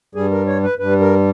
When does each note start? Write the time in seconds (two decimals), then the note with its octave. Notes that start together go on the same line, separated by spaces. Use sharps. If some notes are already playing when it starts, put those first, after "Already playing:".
0.15 G2 G3 G#4
0.31 A#4
0.47 C#5
0.63 B4
0.79 G2 G3 B4
1.00 A#4